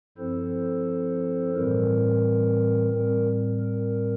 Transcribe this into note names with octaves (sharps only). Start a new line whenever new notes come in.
G2 F3 C4 E4 A4 C5
A2 E3 G3 C4 A#4
A2 G3 C4 A#4
A#4